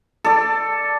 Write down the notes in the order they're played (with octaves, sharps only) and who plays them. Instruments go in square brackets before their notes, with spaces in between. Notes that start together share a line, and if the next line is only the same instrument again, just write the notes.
[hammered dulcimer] A4 D5